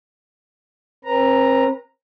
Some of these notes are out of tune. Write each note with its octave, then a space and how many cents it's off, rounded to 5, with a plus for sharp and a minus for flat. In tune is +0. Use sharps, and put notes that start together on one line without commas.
C4 +40 B4 -35 A#5 +0